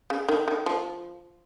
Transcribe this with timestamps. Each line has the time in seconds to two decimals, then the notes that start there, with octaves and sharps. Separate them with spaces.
0.10 C#3
0.29 D#3
0.48 D#3
0.66 F3